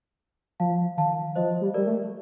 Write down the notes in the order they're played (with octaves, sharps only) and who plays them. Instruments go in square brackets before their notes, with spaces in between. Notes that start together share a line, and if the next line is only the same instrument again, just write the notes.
[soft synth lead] F3 [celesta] F5 A5
[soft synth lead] D#3 [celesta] F5 A5
[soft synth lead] F3 [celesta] C5 D#5
[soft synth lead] G3
[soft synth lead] G3 [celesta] A#4 D5
[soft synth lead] A3